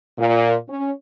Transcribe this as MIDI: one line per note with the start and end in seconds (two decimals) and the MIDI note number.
0.18 0.56 46
0.69 0.90 61